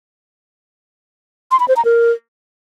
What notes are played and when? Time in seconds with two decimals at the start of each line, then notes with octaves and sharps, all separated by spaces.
1.51 C6
1.60 B5
1.68 C5
1.76 A#5
1.85 A#4